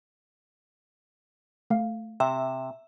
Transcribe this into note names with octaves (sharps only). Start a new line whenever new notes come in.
A3 F5
C3 E5 G5